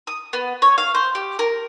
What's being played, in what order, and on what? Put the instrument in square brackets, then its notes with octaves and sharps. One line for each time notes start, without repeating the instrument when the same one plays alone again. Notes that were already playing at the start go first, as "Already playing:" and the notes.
[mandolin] D#6
B3
C#5
F5
C5
G4
A#4